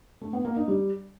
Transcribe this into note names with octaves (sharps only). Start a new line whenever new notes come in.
A3
B3
A#3
D#4
G3